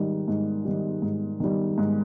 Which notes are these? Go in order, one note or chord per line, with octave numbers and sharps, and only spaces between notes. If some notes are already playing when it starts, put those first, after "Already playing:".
Already playing: G#2 D#3 G3
G#2
D#3 G3
G#2
D#3 G3
G#2